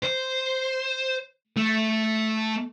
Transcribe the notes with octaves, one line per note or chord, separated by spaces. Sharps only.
C5
A3